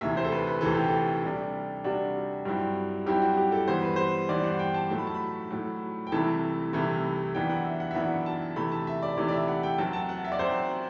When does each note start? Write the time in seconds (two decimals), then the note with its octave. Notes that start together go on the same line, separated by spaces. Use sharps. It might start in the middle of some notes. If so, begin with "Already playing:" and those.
0.01 D2 C3 E3 E5
0.17 C5
0.25 A4
0.32 B4
0.47 B4
0.61 D2 C3 E3 A4
0.75 G4
0.89 A4
1.24 C3 G3 D4
1.84 C3 G3 D4 F#4
2.45 G2 F#3 C4 E4
3.06 G2 F#3 C4 E4 G4
3.22 F#4
3.37 G4
3.52 A4
3.68 G2 E3 B3 C5
3.82 B4
3.96 C5
4.29 G2 E3 B3 D5
4.44 F#5
4.59 G5
4.74 A5
4.90 A2 F#3 A3
4.98 B5
5.07 A5
5.14 B5
5.51 A2 F#3 A3
6.07 G5
6.12 C2 C3 E3 A3 E4 A5
6.73 C2 C3 E3 A3 E4
7.34 F#2 E3 B3 D4 G5
7.50 F#5
7.65 E5
7.80 F#5
7.91 E5
7.95 F#2 E3 B3 D4 F#5
8.26 A5
8.56 C3 E3 A3 B5
8.72 A5
8.87 E5
9.02 D5
9.17 C3 E3 A3 D5
9.28 D5
9.32 E5
9.48 F#5
9.63 G5
9.78 F#2 F#3 C4 A5
9.93 A5
10.09 F#5
10.24 E5
10.32 D5
10.39 F#2 F#3 C4 C5